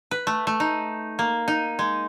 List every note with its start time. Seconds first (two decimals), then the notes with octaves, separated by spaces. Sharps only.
0.11 B4
0.27 A3
0.47 A3
0.60 D#4
1.19 A#3
1.48 D#4
1.79 G#3